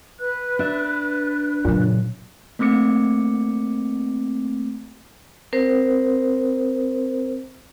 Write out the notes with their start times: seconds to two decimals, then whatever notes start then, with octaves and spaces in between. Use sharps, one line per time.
0.19 B4 F#6
0.59 D4 E5
1.65 F#2 A#2 C#3
2.59 A3 A#3 C4 D6 C#7
5.53 C4 A#4 C5